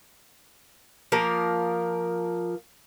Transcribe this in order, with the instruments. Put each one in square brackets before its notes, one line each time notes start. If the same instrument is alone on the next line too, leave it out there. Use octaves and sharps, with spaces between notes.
[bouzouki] F3 A#3 A#4